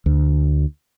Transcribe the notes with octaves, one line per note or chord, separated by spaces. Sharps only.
D2